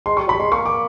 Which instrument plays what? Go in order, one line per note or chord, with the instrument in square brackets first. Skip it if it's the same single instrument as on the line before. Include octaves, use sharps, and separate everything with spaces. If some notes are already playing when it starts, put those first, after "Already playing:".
[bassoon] G#3 [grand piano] C6
[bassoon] G3 [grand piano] C#6
[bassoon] F#3 [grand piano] B5
[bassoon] G3
[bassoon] G#3 [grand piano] C6
[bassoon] A#3 [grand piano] C#6
[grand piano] D6